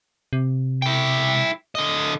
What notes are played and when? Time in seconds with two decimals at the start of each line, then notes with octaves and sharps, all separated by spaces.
0.33 C3
0.82 E4 G5
1.75 D3 D#5